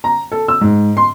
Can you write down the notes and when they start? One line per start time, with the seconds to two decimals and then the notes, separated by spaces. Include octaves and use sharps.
0.04 A#5
0.32 A4
0.48 E6
0.61 G#2
0.97 C6